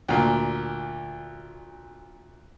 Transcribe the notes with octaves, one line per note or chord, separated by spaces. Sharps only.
D2 A#2